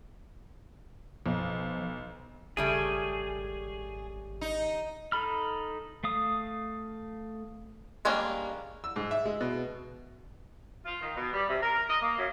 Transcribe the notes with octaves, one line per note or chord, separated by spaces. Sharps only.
B1 F3
G#1 C#3 G3 A3 G#4
D#4
D#4 A4 B5 F6
A3 F5 D#6
G3 G#3 A#3 C#4 D4
E6
G#2
E5
G#3
B2
F4
D#3
B2
G3
C3
A#4
A#4
D#5
A#3
F#2